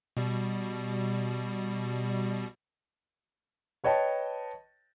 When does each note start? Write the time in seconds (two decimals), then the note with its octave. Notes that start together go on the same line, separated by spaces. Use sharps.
0.17 B2 G3
3.84 B4 C#5 D#5 G5 A5